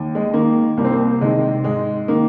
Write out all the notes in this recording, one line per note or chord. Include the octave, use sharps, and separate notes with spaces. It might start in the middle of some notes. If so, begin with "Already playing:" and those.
Already playing: D#2
G#3
D#3 A#3
C2 A#3
C4
A#3
C3 D#3 G#3
G#2 G#3
D#3 A#3